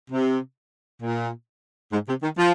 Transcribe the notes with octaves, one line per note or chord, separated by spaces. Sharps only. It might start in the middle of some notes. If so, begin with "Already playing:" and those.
C3
A#2
G#2
C3
D#3
F3